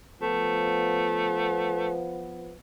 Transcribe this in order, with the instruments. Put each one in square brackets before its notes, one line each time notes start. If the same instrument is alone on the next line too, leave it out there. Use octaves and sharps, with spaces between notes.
[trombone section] F3 B3 [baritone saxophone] A3